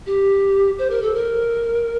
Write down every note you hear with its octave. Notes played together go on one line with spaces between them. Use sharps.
G4
C5
A#4
A4
A#4